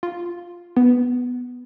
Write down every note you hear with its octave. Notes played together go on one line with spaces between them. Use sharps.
F4
B3